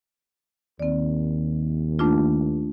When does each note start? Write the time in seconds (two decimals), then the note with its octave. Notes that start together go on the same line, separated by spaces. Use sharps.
0.80 D#2 C4 D5
1.99 A3 D4 F4